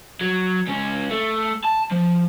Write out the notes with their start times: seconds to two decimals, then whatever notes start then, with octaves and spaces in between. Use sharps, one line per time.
0.21 F#3
0.68 C#2 C#4
1.11 A3
1.65 A5
1.92 F3